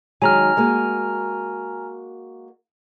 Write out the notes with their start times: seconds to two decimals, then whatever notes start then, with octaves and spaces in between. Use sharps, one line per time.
0.22 D#3 F#3 G#3 G#5 A#5 F6
0.57 G#3 A#3 F#4